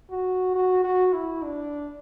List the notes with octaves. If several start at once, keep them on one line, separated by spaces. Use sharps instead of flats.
F#4
F#4
F#4
E4
D4